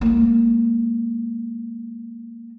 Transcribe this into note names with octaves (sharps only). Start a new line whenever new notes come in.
G#3 A#3